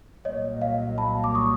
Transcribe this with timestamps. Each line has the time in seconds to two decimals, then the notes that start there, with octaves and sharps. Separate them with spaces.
0.25 C2 A#2 F#3 A#3 C#5 D#5
0.62 D#5 F5
0.98 A5 B5
1.24 D6
1.35 C#6 D#6